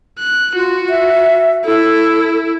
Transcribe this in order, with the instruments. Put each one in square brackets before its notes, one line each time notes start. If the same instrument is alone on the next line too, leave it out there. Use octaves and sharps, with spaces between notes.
[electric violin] F#6
[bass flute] F4 [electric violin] F#4
[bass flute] E5
[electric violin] E4 [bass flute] A4